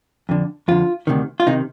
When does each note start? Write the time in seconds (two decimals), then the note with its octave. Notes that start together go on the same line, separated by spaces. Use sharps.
0.29 F2 D3
0.68 F2 D3 F4
1.07 D2 C3 D#3
1.40 F4
1.47 C3 D#3 D#4